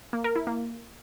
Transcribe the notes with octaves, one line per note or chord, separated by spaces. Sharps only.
A#3
A#4
E4
A#3